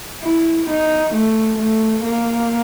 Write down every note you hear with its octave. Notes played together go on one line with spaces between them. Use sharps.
E4
D#4
A3
A3
A#3